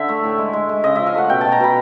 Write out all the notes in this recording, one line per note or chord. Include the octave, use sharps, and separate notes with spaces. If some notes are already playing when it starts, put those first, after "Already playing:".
Already playing: D3 E5
A3
A2
G#3
G#3
G#3
C#3 D#5
F3 E5
F5
A3 F#5
B2 G5
B2 A5
A#5
B2 B5